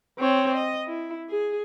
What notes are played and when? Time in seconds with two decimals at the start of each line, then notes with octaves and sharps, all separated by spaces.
0.19 C4 C#5
0.55 D#5
0.87 E4
1.29 G#4